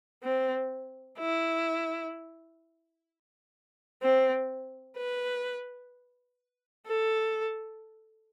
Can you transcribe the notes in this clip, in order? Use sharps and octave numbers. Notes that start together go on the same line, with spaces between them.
C4
E4
C4
B4
A4